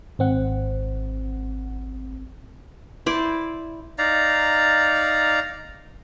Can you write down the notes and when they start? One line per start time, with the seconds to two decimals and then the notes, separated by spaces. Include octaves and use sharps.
0.19 G#1 C4 F#5
3.06 E4 C5 D5
3.98 D#4 D5 F5 A#5